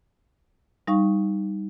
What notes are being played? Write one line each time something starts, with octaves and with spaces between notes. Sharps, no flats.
G3 D#4 F5 C#6